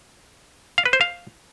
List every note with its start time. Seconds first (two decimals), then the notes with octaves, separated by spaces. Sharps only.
0.78 F5
0.85 B4
0.93 C5
1.01 F5